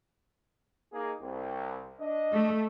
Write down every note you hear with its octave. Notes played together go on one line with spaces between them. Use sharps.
A#3 D#4 G#4
C2
D4 D#5
A3